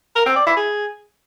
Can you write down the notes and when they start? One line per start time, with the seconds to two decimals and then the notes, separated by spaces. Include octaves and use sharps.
0.16 A#4
0.26 C4
0.36 D5
0.46 E4
0.56 G#4